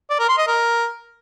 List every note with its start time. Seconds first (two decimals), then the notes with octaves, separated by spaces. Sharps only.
0.10 D5
0.19 A#4
0.29 C6
0.38 D#5
0.47 A#4